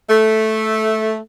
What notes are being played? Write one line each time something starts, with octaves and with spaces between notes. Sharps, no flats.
A3